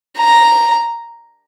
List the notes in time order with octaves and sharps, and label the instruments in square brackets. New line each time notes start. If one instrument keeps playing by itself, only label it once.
[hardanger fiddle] A#5